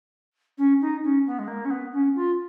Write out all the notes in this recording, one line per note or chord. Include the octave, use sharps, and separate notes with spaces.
C#4
D#4
C#4
B3
G#3
A#3
C#4
B3
C#4
F4